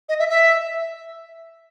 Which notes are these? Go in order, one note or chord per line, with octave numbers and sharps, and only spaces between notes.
D#5
E5
E5